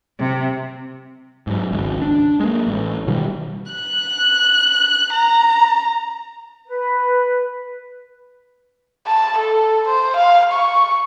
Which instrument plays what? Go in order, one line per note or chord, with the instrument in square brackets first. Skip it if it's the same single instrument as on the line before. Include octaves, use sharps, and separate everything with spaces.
[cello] C3
[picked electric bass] G#2 F#3
G#1 C#2
D4
G#3 A#3
A1
B2 D#3 F3 G3
[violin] F#6
A#5
[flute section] B4
[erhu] A5
A4
C5
F5
C#6